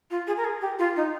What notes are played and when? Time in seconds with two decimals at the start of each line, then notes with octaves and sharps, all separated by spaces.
0.10 F4
0.27 G#4
0.37 A#4
0.45 G#4
0.61 G4
0.79 F4
0.96 D#4